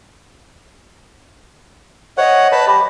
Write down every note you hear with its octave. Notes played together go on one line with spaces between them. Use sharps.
C5 C#5 D#5 E5 F#5
B4 C#5 A5 B5
G4 B5 D6